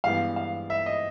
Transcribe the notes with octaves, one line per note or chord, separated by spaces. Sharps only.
G2 E3 G#3 B3 F5
F5
E5
D#5